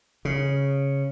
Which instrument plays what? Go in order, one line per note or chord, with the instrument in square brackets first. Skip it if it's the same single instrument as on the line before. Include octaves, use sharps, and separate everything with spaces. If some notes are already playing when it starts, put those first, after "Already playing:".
[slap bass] C#3